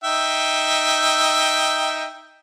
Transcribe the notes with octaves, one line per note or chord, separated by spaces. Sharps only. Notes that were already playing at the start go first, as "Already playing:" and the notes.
D#4 E5 G5